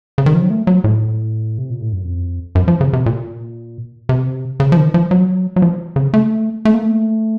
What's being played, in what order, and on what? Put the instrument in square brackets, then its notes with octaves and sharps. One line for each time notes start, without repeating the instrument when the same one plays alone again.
[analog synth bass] C#3
D#3
F3
F#3
A3
F#3
A2
C3
A#2
A2
F#2
F2
F#2
F3
C#3
C3
A#2
C3
C#3
F3
D#3
F3
F#3
F#3
F3
C#3
A3
A3
A#3
A3